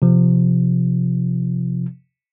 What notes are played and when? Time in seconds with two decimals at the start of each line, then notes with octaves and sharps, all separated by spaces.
0.02 C3 F3